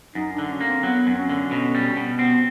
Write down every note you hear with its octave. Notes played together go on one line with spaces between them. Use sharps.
F#2 D#4
D4
D3
C#4
A#3
C4
F#3 B3
F#2
C4
C#4
D3
B2
G3
B2
B3 C4